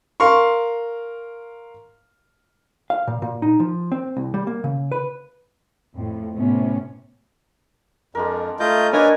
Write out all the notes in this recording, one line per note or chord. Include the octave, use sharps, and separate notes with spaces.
A#4 F5 C6 C#6
F5
A#2
A#2
D#4
F3
C4
C2
G3
A#3
C#3
B4
F2 A2
A2 C3 B3 C#4
F2 G#3 D4 A#4
A3 F4 D5 D#5 G6
A#3 D4 A#4 B4 C#5 D#5 G#5